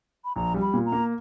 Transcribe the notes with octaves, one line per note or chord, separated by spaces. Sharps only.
B5
A#1 A#5
G3
B5
A#2
A#5
A#3